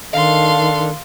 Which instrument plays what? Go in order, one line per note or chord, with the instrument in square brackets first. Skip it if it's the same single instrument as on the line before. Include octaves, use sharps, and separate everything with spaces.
[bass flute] D#3 [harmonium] D4 A4 [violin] F5 C6